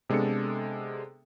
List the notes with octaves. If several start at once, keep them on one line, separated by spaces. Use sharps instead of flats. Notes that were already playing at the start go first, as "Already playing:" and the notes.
C3 G#3 B3 D4 A4 C#7